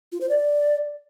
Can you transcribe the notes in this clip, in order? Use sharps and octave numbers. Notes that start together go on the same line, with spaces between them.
F4
C5
D5